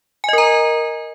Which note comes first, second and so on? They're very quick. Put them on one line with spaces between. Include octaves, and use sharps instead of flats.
G#5 D#5 A#4 A#5